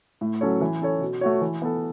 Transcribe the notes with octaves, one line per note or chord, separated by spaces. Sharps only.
A2
F#3 C#4 A4 C#5
E3
C#4 A4 C#5
B2
A3 F#4 C#5
E3
B3 A4